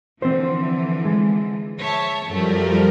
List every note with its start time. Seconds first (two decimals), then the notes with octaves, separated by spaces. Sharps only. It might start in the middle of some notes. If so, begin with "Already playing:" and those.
0.22 D3 E3 F3 C4 C5
1.05 G#3
1.78 C#5 E5 A5
2.27 F#2 F3 G3 A3 A#4